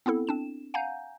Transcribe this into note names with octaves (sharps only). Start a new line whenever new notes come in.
B3 C4 E4 A4
C4 D4 E7
F5 F#5 G#5 A#5 G6